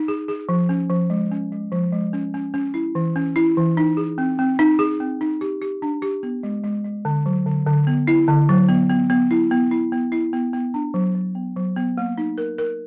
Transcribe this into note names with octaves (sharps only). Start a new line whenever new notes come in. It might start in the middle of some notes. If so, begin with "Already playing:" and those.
Already playing: D#4
G#4
G#4
F3
C#4
F3
G#3
C#4
G#3
F3
G#3
C#4
C#4
C#4
E4
E3
C#4
E4
E3
D#4
G#4
C4
C4
D#4
G#4
C4
D#4
G4
G4
D4
G4
B3
G#3
G#3
G#3
D3
F#3
D3
D3
B3
E4
D3
F#3
B3
B3
B3
E4
B3
E4
B3
E4
B3
B3
D4
F#3
F#3
B3
F#3
B3
A#3
D#4
A#4
A#4